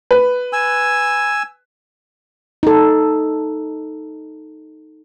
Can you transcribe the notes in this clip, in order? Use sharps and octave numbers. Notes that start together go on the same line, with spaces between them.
B4
G#5 E6
D#4 A4